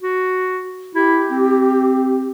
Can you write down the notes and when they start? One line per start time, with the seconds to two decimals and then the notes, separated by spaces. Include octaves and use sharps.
0.02 F#4
0.95 E4 G4
1.30 C4